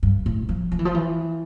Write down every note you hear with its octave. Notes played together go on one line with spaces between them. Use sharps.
G2
A2
F3
F3
E3
F3
E3